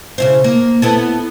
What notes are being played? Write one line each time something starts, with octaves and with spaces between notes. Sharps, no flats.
C#3 E4 C5
A#3
B3 E4 A4